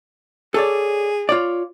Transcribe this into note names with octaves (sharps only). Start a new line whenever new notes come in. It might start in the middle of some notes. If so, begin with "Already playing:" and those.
G#4 A4 C#5 D5
F4 C#5 D5